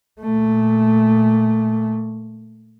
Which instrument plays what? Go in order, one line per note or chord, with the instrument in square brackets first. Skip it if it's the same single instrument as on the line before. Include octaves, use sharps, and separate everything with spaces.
[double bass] A#2 A3